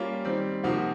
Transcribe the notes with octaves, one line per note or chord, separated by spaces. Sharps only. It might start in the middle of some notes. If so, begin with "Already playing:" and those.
Already playing: G3 A#3 C#4 F4
D#3 G3 C4
C3 F3 A#3 D#4 F#4